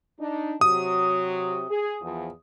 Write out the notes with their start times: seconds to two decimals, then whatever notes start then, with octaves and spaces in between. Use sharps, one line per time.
0.20 D4 D#4
0.61 C3 F#3 D#6
1.70 G#4
2.02 E2 F3